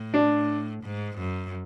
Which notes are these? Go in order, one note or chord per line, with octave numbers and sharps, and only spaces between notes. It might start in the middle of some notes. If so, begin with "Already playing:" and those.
Already playing: A2
D4
G#2
F#2